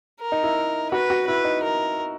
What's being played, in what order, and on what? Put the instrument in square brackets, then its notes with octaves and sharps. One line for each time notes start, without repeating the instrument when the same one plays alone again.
[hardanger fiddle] A#4
[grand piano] D#4
E4
[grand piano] F#4 [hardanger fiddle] B4
[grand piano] F#4
[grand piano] E4 [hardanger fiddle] B4
[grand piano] D#4
[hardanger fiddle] A#4